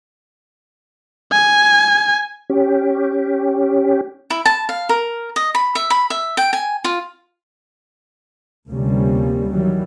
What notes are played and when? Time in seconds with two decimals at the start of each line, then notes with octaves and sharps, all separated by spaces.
1.32 G#5
2.50 C#4 G4
4.30 E4
4.46 A5
4.69 F5
4.89 A#4
5.36 D#5
5.55 B5
5.75 E5
5.90 B5
6.10 E5
6.37 G5
6.53 G#5
6.84 F4
8.70 D2 C3 F3 G3 A#3 C#4
9.52 D#3 E3 F#3 G3